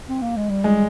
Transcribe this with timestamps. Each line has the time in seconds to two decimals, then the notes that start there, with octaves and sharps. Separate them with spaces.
0.08 C4
0.21 A#3
0.36 G#3
0.50 G3
0.64 G#3